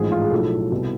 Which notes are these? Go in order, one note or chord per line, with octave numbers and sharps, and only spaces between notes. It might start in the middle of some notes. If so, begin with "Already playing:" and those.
Already playing: A1 G#2 F3 G#4
F4
G#4
B1 A2 F3 A4
C2 B2